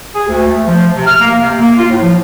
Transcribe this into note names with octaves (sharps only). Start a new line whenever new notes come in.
G#4
D2
A3
F3
C3
F6
A#3
C3
A#3
F4
A2
F3